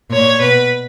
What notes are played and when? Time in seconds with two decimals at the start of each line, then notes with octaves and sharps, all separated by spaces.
0.10 A#2 C#5
0.39 B2 B4